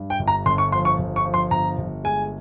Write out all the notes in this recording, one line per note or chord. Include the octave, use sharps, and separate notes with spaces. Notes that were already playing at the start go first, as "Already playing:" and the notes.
Already playing: G2
G5
G1
A#5
G1 C6
C#6
F3 C6
C#6
G1
C#6
F3
C6
G1 A#5
G1
G#3 G#5